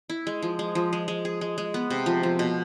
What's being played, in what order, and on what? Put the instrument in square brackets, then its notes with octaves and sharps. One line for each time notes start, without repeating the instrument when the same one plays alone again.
[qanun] E4
G#3
F3
G#3
F3
G#3
G#3
G#4
G#3
G#3
B3
C3
F3
F3
B2